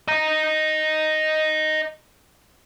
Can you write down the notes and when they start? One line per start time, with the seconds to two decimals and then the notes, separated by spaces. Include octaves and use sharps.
0.08 D#5 A#5